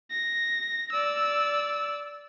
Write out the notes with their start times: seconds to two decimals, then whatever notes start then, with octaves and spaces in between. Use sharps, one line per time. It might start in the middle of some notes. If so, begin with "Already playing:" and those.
0.11 A#6
0.93 D5 E6